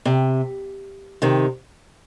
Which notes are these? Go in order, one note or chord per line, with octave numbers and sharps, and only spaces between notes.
C3
C3 D#3